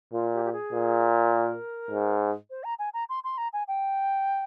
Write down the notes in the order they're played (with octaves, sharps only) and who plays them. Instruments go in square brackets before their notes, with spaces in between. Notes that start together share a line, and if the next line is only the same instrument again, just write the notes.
[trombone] A#2 [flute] F4
[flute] G4
G4
G#4
[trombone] A#2
[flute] A#4
[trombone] G#2
[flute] C5
A#5
G#5
A#5
C6
C6
A#5
G#5
G5